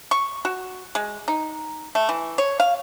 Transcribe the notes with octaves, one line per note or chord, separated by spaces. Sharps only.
C#6
F#4
G#3
D#4
A3
E3
C#5
F5